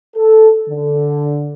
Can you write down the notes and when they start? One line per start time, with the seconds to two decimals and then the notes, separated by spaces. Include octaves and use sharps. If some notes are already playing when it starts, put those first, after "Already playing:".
0.17 A4
0.69 D3